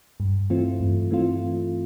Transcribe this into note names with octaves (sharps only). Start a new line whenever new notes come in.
G2
E3 A3 C4 F4
G2
E3 A3 C4 F4